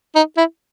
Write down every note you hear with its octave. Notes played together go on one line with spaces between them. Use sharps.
D#4
E4